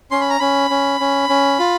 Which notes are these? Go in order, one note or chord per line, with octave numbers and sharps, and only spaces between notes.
C#4 C6
B5
A#5
C#4 B5
C#4
C#4
C#4
F4